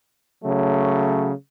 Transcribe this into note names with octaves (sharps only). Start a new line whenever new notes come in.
C#3 F#3 A3